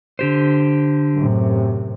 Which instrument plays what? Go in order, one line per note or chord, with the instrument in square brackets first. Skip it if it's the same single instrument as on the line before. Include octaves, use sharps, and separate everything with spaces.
[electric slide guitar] D3 G4 C5
[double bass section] F#2 A2 C3